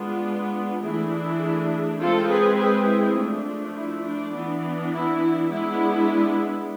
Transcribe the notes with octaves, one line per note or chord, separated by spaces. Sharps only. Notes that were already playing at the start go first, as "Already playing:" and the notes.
Already playing: G#3 B3 D4 F4
E3 A3 D4 E4 G#4
G#3 C4 F4 A4
G#4 B4
G#4 B4
E4 G#4
F3 A3 D4
E4
D4
E3 B3 D4
E4
G#3 B3 D4 E4